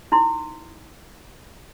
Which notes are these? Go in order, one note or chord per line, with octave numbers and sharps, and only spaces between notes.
D#4 E4 C6